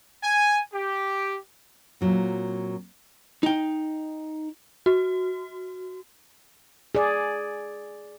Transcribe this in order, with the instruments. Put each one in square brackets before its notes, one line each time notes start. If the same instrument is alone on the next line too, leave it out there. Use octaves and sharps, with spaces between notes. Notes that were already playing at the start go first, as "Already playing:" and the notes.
[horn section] G#5
G4
[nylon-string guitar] A#2 F#3 C4
[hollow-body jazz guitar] D#4 G5
[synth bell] F#4
[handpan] G#4 D5